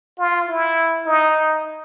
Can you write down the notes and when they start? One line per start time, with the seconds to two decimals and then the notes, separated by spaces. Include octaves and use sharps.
0.18 F4
0.49 E4
1.06 D#4